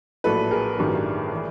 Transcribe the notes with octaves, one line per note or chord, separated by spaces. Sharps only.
A#1 A2 F#3 A4 B4
G#4 A#4
A1 G2 D#3 F#3
E3